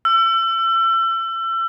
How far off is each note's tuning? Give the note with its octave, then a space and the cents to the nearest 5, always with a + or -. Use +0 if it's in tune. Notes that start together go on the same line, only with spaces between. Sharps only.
E6 +35